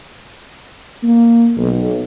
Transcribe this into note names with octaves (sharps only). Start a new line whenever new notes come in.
A#3
B1